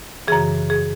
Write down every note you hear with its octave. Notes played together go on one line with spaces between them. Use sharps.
F#2 C#3 E3 G#4
G#4